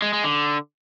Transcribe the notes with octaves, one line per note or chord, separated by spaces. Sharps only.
G#3
G#3
D3